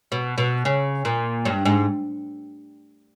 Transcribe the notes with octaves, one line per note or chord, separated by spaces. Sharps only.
B2
B2
C#3
A#2
G2
G#2